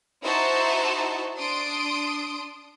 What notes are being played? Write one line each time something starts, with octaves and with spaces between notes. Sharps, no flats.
D#4 E4 F#4 C5 E5 A5
D4 C6 D#6 D7